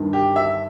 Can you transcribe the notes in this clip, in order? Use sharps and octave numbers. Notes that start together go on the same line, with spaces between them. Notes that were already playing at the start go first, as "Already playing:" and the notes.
Already playing: G1 G2 D#3
G4
E5